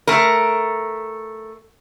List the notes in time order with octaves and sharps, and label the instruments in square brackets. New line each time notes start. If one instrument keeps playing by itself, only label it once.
[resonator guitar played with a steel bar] A3 A#4